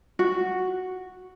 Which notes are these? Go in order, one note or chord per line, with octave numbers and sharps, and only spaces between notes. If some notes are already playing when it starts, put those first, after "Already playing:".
F#4